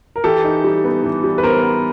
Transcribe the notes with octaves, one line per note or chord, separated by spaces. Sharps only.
A#4
E3 G4 A4
D#4
G3
B3
E3
G3
B4
B3 A#4 C5
B3